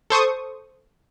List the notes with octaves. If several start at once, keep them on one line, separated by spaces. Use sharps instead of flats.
A4 C5 C#6 D#6